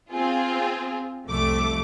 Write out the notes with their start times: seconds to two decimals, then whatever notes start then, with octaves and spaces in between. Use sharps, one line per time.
0.12 C4 F4 G#4
1.26 C2 F2 A3 D6